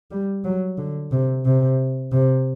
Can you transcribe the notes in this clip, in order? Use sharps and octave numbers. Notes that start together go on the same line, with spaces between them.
G3
F#3
D3
C3
C3
C3